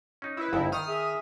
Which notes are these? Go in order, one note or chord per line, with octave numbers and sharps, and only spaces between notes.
C#4 D#4
E4 B4
G1 C2 F2 D#4 E4
D#3 D#6 F6
G#4 E5